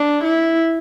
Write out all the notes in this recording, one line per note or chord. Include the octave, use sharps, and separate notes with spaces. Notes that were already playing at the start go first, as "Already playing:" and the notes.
Already playing: D4
E4